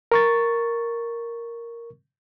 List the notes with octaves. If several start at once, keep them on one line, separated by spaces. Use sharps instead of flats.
A#4 C#6 A6